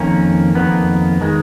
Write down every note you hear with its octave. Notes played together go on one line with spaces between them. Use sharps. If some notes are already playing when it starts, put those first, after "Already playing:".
Already playing: F2 D#3 A#3 C#4
F2 D#3 A#3 B3
D#3 G#3